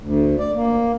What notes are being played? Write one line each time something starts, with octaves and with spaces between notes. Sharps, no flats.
D2
D5
A#3